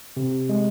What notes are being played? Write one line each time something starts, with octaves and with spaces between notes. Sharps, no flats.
C3
G#3